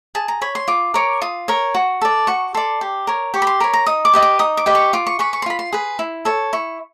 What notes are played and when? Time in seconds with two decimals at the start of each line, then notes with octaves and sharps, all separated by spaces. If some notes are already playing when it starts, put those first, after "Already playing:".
0.15 G#4 A5
0.28 A#5
0.42 C#5 B5
0.55 C6
0.68 F4 D6
0.94 A#4 C#5 D6
1.21 F4 D#6
1.48 A#4 C#5
1.75 F#4
2.02 A4 D5
2.27 F#4 C#6
2.54 A4 D5 C6
2.81 G4
3.07 A#4 C#5
3.34 G4 C#6
3.42 B5
3.47 C6
3.60 A#4 C#5 B5
3.73 A#5
3.86 D#4 D#6
4.05 D6
4.13 G4 B4 D#5
4.22 D6
4.39 D#4 D#6
4.57 D6
4.66 G4 B4 D#5
4.75 C#6
4.93 F4 D6
5.07 C#6
5.19 G#4 B4 C#6
5.33 C#6
5.42 C6
5.46 F4 B5
5.59 C6
5.72 G#4 B4
5.99 E4
6.25 A4 C#5
6.53 E4 C#6